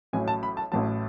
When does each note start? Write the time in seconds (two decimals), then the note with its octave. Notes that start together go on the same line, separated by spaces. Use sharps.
0.13 A1 A2 F#3 G#5
0.28 A5
0.43 B5
0.57 A5
0.72 A1 A2 F#3 A5